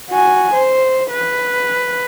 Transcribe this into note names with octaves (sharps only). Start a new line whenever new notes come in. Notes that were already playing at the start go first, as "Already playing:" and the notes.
F#4 G#5
C5
B4